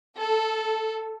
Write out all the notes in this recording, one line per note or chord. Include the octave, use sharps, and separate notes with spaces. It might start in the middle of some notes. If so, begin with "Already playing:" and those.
A4